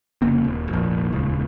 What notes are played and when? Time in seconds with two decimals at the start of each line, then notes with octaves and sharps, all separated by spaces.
0.22 F1 C#3 A#3 C4
0.44 D#1
0.69 F1 A#1
1.12 D#1 C#2